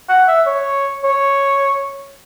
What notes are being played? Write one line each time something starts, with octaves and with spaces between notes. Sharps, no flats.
F#5
E5
C#5
C#5